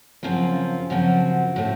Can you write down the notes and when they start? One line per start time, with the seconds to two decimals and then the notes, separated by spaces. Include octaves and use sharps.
0.23 F#2 C#3 F3 C4 F4
0.90 F#2 C#3 F3 C4 F#4
1.56 A2 A3 C4